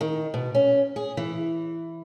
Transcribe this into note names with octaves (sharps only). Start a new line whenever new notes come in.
D#3
B2
C#4
G#4
E3